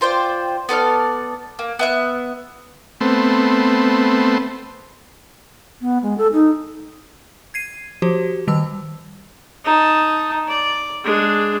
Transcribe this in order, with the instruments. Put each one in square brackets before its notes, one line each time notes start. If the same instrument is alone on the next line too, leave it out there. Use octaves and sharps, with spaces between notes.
[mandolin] F4 C5 D5 G5
B3 A4 D5 F6
A#3
B3 E5 F#6
[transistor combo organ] A3 B3 C4
[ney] B3
G#3
A4
D#4
[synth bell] G#6 C7 D#7
F3 F#4 G4 C5
D#3 G3 A5 E6
[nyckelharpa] D#4 A5
D5
G#3 D4